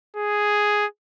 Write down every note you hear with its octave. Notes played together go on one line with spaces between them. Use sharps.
G#4